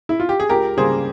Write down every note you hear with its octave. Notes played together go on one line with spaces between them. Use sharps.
E4
F4
G4
G#4
C#2 G4 A#4
C#3 G3 A#3 G#4 C5